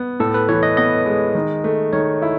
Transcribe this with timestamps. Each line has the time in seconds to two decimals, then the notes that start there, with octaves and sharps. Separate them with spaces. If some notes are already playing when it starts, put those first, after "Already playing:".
Already playing: B3
0.20 A2 A4
0.34 B4
0.49 E3 C#5
0.63 D#5
0.77 B3 D#5
1.06 G#3
1.35 D#3
1.64 A3
1.93 D#3 C#5
2.22 E4